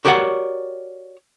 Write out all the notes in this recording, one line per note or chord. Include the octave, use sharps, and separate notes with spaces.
F#4 G4 A#4 C#5 D5 F#5